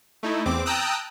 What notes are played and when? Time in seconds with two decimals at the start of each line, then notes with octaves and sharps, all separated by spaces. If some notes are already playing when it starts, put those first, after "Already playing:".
0.23 A3 D#4 E4
0.46 E2 C4 D6
0.66 G5 A5 A#5 D#6 E6 F#6